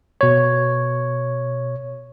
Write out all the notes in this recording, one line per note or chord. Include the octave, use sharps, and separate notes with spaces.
B2 C#5